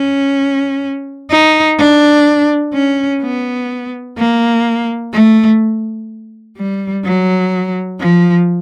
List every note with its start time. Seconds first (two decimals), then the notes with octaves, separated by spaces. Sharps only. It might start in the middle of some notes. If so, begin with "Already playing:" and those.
Already playing: C#4
1.30 D#4
1.79 D4
2.74 C#4
3.22 B3
4.17 A#3
5.13 A3
6.57 G3
7.05 F#3
8.00 F3